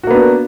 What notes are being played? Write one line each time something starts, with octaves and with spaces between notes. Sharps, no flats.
A#3 B3 D4 F#4